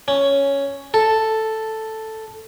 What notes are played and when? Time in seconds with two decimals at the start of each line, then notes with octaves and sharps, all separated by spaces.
0.08 C#4
0.94 A4